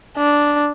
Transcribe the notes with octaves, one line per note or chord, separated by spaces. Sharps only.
D4